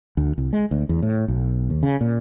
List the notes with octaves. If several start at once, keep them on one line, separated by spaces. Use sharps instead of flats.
D2
C2
G#3
D2
E2
A2
B1
D#2
C#3
A#2